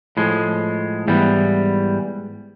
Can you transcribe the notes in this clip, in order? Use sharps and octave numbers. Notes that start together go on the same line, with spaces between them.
A2 F3 G#3
G#2 E3 G3 B3